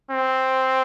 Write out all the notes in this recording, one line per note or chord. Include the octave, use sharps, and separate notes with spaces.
C4